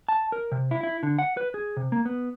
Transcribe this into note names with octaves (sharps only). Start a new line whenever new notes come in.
A5
A#4
C3
E4
E4
D3
F#5
B4
G#4
C3
A#3
B3